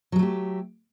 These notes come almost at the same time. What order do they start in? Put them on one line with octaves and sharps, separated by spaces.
F#3 G#3 A3 G4